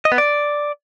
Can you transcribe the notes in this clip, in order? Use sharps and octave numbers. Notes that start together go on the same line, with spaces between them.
D#5
B3
D5